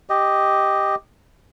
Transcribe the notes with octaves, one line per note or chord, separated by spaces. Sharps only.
G4 D#5